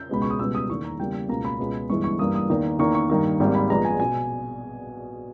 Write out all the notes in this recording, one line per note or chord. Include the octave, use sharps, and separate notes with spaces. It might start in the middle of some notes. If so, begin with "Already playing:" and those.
Already playing: G6
C#2 B2 G#3 B3 B5
C#6
D#6
C#2 B2 G3 B3 E6
D#6
E2 D#3 A#3 C#6
A#5
E2 C#3 G3 A#3 G5
C#2 B2 A#3 A#5
B5
C#2 B2 G#3 B3
G1 G2 E3 G#3 C#6
C#6
G2 E3 A#3 D#6
D#6
E2 D#3 A#3
E2 D#3 A#3 C#6
C#6
G2 D#3 A#3
G#1 G#2 G3 A#3
B5
A#1 A#2 G#3 B3 A#5
G#5
B2 G#5